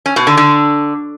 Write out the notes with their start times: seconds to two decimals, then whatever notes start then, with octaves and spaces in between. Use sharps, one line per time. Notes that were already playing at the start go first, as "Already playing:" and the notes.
0.06 C#4
0.16 B2
0.27 D3
0.37 D3